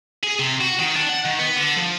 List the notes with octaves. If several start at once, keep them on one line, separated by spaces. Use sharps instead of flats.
G#4
C3
F#4
D#3
D4
F#5
D#3
B3
D3
F3